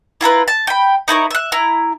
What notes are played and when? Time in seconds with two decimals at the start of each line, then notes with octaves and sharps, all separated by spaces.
0.21 E4 F4 A#4 B4
0.48 A5
0.67 G5 B5
1.08 D#4 E4 A#4 C#5
1.31 E5 F#6
1.52 E4 A#5